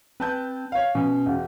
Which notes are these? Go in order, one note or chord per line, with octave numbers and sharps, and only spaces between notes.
C4 B4 A5 G6
C#5 F5
B2 C#4
E1